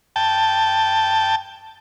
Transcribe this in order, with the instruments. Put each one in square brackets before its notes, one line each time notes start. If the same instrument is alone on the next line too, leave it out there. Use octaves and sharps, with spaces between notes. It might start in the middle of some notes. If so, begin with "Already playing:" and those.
[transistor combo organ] G5 A5